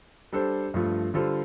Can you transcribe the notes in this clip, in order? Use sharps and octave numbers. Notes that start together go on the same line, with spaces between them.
G3 D4 A4 C5
G2 F3 A3 F4
D3 G3 F4 A4 C5